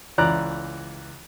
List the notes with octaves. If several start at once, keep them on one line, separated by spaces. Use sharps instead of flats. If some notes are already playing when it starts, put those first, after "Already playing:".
C#2 E3 D5 A#5 D6 F#6